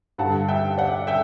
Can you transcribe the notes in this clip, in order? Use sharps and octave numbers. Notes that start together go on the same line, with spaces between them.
G2 D3 F#5 A5
E5 G5
D5 F#5
E5 G5